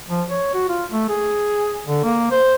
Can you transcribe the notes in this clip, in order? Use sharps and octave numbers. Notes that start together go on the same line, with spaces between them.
F3
C#5
F#4
F4
A3
G#4
D3
A#3
C5